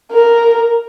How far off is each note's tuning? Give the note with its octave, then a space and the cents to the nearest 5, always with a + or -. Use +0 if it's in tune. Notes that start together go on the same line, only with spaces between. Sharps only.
A#4 +0